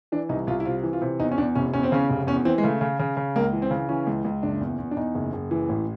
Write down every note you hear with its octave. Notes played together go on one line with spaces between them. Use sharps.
E3 D4
C2 D#4
C2 F4
E4
C3 F4
E3
F4
C3
E2 D#4
C#4
E2 D4
F1 C#4
E2 C#4
C4
C#3 C#4
F1
E2 C#4
E3 C4
G#3
C#3 A3
C#3
C#3
C#3
C#2 A#3
E3
C4
C#3
E3 C#4
C#2
C#2
F#1 D4
E2
E2
D4
E2 D#4
F#1
F#1
E3
A1